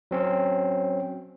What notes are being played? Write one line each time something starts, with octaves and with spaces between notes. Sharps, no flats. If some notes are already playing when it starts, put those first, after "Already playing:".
F#3 C4 C#4